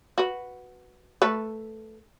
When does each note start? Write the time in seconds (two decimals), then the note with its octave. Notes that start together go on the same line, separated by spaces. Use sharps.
0.18 F#4 B4
1.22 A3 A4 B4